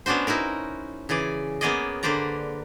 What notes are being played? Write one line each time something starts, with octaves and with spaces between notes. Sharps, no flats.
B3 C#4 D4 F#4 C5
D#4 E4 F#4 A#4
C#3 E3 G#4 D5
A#3 B3 C#4 G#4 D5 D#5
D3 A#3 B4 C5 D5 A#5